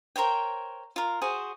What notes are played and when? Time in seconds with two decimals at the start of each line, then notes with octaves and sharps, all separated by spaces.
0.16 A#4 C5 C#5 G5
0.96 F4 A#4
1.22 F#4 G#4 C5